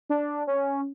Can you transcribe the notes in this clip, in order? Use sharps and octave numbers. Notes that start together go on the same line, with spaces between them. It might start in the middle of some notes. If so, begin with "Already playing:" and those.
D4
C#4